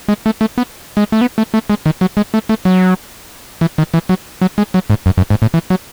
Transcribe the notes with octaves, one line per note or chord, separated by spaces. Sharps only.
G#3
A3
A3
B3
G#3
A3
B3
A3
A3
G#3
D#3
F#3
G#3
A3
A3
F#3
E3
D#3
E3
F#3
F#3
G#3
F#3
G#2
F#2
F#2
G#2
A2
E3
F#3